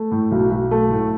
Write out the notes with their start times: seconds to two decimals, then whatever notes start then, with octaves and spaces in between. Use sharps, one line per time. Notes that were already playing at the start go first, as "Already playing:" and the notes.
Already playing: A3
0.11 A2
0.31 B1
0.51 B1
0.71 A3
0.90 A2